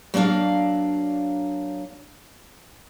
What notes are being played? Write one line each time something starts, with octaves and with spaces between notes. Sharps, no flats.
F#3 A#3 C4 D4 F5